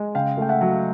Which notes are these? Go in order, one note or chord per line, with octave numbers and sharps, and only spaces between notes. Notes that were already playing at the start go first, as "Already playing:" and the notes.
Already playing: G#3
C#3 F5 G5
A3 G5
E5 F#5
F#3